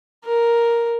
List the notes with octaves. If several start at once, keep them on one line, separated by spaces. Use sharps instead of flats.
A#4